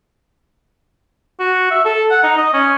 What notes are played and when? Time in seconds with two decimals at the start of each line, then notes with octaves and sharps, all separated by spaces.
1.39 F#4
1.71 E5
1.85 A4
2.10 F#5
2.23 D#4
2.37 D#5
2.53 C#4